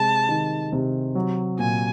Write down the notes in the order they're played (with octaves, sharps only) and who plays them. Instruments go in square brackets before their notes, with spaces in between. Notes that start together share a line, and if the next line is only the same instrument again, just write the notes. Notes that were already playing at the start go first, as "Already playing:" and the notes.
Already playing: [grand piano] C3 G#3 [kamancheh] A5
[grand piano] D#3
C3
F#3
[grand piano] A#2 [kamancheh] G#5